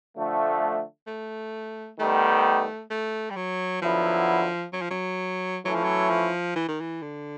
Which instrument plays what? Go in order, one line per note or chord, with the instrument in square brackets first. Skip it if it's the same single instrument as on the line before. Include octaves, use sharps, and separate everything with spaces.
[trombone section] D3 F3 A3
[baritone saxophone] A3
[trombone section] D#3 G3 B3 [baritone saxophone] A3
[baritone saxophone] A3
G3
F#3
[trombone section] D3 F#3 B3 E4 [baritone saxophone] F3
[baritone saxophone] F#3
F3
F#3
[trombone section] E3 A3 C#4 E4 [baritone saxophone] F#3
[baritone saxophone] F3
F#3
F3
E3
D#3
E3
D3